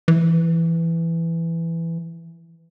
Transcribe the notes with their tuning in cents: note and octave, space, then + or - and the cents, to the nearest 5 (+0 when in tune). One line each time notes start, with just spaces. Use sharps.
E3 +10